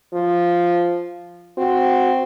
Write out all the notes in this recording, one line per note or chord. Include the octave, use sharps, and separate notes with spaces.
F3
C4 F#4